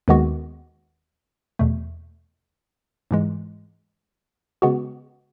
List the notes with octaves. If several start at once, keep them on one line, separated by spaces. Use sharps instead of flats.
D#2 D#3 G#3 B3 F#4
E2 B2 A3
G#2 E3 G#3
C#3 G#3 B3 F#4